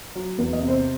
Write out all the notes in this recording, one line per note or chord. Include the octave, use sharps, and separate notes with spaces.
F#3
E2 B4
D#5
C3
C5